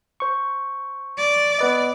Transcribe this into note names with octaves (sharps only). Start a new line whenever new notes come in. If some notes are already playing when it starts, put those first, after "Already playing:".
C5 C#6
D5
B3 B4 D#5